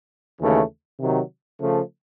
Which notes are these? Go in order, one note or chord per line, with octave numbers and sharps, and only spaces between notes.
D#2 C#3 E3 A3
C3 D#3 F#3
C#3 F3 A3